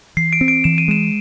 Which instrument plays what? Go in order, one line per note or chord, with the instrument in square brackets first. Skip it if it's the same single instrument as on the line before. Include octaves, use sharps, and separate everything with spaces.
[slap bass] E3 [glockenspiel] C7
[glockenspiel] D7
[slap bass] C4
[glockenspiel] D7
[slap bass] E3 [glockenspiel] E7
[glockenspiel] D#7
[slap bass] G#3 [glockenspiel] E7